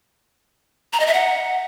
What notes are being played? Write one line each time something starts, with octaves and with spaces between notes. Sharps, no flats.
A#5
D#5
E5
F#5